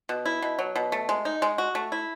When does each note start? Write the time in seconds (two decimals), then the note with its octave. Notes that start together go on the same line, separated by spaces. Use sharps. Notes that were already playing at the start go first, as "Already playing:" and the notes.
0.09 B2
0.26 E4
0.42 B2
0.59 F#3
0.76 B2
0.92 A3
1.09 G#3
1.25 D#4
1.42 G#3
1.58 F#4
1.75 A3
1.92 E4